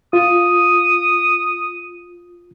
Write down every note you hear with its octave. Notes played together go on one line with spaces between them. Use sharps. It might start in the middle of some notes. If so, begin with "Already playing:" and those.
F4 D#6